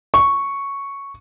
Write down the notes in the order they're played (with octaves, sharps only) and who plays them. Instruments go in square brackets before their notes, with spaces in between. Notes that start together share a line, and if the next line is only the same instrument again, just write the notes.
[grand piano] C#6